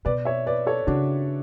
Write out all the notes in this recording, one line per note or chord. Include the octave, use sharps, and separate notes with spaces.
B2 B4 D5
C#5 E5
B4 D5
A4 C#5
C#3 D4 F#4